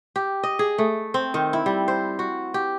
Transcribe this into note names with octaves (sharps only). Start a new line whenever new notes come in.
G4
D#5
G#4
A3
C4
D#3
E4
G3
C5
F#4
G4